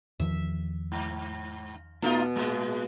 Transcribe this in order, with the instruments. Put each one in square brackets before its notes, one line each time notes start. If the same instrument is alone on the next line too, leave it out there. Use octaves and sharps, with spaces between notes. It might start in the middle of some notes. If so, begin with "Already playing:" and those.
[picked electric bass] E2 D#3 F3 [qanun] E5
[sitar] G#2
[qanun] B2 [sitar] A3 D#4 F4
[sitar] A2 G#3